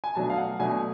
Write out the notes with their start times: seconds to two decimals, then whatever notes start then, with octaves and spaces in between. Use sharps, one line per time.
0.04 G#5
0.15 B2 F#3 A3 D4 A5
0.30 F5
0.38 F#5
0.59 B2 F#3 A3 D4 G#5